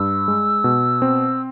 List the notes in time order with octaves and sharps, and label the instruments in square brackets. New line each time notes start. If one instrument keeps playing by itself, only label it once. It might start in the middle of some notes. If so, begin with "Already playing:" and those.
Already playing: [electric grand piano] G2 [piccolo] E6
[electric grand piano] G#3
B2
C4